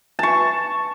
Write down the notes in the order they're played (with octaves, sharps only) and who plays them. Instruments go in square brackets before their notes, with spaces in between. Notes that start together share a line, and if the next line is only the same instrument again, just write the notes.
[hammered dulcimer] A5 C#6